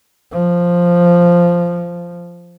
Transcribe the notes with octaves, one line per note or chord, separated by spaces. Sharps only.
F3